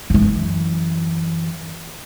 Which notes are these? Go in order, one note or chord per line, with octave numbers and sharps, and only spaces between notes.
F#2 E3